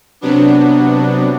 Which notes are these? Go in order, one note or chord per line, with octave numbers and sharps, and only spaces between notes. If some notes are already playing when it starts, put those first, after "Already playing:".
C3 F#3 B3 D4